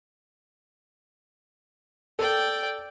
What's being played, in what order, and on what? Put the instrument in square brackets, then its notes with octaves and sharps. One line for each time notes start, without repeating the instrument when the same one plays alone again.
[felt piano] A4 [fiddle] D5 G5